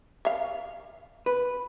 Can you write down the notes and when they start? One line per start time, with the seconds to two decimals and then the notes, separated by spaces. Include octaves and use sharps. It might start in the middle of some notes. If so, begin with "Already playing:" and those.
0.25 E5 F5
1.26 B4